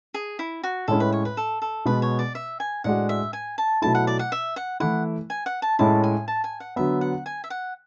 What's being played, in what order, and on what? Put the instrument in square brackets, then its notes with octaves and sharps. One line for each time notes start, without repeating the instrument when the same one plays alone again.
[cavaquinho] G#4
E4
F#4
[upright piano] A2 G#3 C#4 E4 [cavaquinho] A4
[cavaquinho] B4
C#5
B4
A4
A4
[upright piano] B2 G#3 B3 [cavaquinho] B4
[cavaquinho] C#5
D5
E5
G#5
[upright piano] A2 G#3 D4 F#4 [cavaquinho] F#5
[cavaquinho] E5
G#5
A5
[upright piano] B2 F#3 A3 E4 [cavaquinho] A5
[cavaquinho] F#5
D5
F#5
E5
F#5
[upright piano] E3 A3 E4 [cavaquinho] F#5
[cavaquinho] G#5
F#5
A5
[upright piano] A2 G#3 C#4 E4 [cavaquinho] A5
[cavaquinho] G#5
A5
G#5
F#5
[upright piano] D3 F#3 B3 [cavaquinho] E5
[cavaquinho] F#5
G#5
E5
F#5